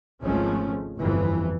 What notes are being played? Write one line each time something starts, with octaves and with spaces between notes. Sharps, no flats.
G#1 C#2 F3 G#3 A3 C#4
G1 F2 E3